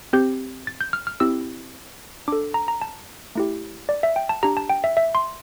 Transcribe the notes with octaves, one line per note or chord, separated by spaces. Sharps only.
C4 G4 G6
A6
G6
F6
F6
C4 E4 G4 E6
D4 A4 D6
A#5
A#5
A5
A3 E4 G4
D5
E5
G5
A5
D4 G4 A#5
A5
G5
E5
E5
C6